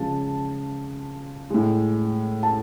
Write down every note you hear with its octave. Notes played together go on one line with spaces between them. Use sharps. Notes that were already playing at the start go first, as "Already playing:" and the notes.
Already playing: C#3 F3 G#3 A5
A2 G#3
A5